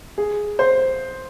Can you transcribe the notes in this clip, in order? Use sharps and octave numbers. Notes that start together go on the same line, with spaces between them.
G#4
C5